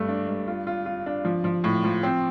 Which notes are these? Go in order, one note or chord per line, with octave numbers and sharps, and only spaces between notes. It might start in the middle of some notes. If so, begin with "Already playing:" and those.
Already playing: G2 A3
D4
G2
F4
F4
F4
D4
F3
F3
A2
F3
C4